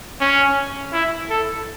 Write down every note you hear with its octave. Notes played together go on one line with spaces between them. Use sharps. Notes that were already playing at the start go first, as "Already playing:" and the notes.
C#4
E4
A4